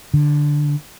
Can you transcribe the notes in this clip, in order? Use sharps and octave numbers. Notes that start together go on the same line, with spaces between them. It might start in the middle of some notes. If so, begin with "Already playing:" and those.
D3